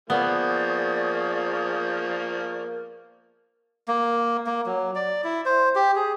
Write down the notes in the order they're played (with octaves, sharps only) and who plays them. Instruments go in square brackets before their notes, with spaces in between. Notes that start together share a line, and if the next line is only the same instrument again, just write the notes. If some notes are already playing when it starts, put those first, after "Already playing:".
[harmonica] F3 A#3 [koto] B3 [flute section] G#4 D5 C#6
[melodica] A#3
A#3
F#3
D5
E4
C5
G4
G#4